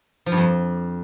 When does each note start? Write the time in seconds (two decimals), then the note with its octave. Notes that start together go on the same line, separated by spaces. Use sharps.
0.26 F3
0.32 G2
0.37 F2